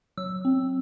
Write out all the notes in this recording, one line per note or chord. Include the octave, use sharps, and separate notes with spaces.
F#3 E6
C4